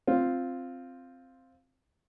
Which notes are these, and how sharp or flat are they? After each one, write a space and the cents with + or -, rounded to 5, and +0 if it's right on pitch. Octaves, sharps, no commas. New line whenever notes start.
C4 +0 F4 +0